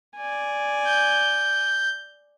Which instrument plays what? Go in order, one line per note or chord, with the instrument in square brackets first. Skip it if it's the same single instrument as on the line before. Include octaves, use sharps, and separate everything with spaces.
[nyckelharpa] D5 G#5
[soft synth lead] G6